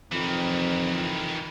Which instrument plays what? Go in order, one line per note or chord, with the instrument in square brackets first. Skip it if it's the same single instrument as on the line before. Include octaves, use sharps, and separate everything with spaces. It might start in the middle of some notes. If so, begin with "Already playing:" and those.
[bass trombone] F2 [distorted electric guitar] D#3 E3